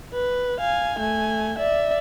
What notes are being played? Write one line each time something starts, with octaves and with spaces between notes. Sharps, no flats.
B4
F5 G#5
A3 G#5
D5 E5